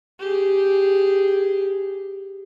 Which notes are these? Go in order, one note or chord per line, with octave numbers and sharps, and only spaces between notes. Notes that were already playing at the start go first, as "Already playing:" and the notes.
G4 G#4